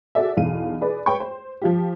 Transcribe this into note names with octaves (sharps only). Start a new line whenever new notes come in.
F#4 G#4 A4 D5 E5
B1 E2 F5 D#7
G#4 B4 D5
B4 C#5 G5 B5 C#6
C5
F3 F4 G4